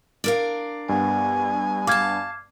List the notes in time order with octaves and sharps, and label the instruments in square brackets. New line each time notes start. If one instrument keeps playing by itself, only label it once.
[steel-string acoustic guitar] D4 A#4 F5
[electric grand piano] G2 B3 [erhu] G#5
[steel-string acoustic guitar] F5 A5 [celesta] D6 F6 G#6